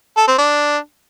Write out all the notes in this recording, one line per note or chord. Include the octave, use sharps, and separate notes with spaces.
A4
C4
D4